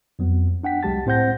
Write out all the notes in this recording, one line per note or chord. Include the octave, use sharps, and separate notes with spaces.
F2 F#3 B3
D4 F#5 G5 B6
C2 F#3 G#3 G4 A5 A6
A2 C4 C5 F#5 G6 A#6